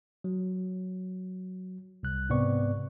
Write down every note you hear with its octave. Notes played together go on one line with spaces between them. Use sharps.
F#3
C2 F#6
G#2 C3 B3 C4 D5 C#6